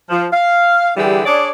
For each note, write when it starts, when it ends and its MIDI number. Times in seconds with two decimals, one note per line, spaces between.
0.10 0.26 53
0.32 0.89 77
0.97 1.21 50
0.97 1.21 52
0.97 1.21 55
0.97 1.21 64
0.97 1.21 67
0.97 1.21 68
1.25 1.49 62
1.25 1.49 68
1.25 1.49 73
1.25 1.49 74